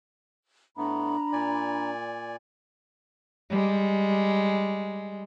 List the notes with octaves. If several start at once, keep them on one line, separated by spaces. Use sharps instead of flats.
A2 A3 B3 D4 A#5 B5
A#2 D5 G#5
G3 G#3